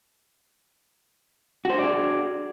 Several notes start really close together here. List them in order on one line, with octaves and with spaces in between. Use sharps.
F#4 C5 D4 D5 G#4